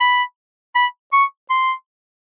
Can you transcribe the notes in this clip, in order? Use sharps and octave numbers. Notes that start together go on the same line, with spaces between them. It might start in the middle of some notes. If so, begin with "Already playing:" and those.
B5
B5
C#6
C6